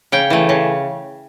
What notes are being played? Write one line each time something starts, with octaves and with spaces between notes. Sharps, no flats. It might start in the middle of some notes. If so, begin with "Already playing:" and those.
C#3 G5
E3 A3
C#3